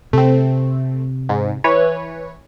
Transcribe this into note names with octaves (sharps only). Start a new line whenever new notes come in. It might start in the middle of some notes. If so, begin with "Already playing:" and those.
C3 A3 C4
G#2
E3 B4 C#5